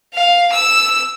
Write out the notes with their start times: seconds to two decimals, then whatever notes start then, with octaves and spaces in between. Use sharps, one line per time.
0.14 F5
0.53 E6